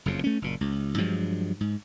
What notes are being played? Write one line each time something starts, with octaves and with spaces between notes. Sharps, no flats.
F#1 F2 C#3
A3 C#4
F#1 A#2
C#2
G2 F3 F#3 G#3
G#2